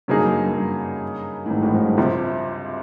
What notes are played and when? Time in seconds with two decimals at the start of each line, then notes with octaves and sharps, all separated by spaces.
0.08 G2 C#3 F#3 A#3 D#4 G#4
0.19 F#2
0.32 G2
0.43 G2
0.56 G2
1.46 A2
1.50 G#1 G#2
1.62 A1 A2
1.73 G#1 G#2
1.86 G2
1.97 C#2 C3 F3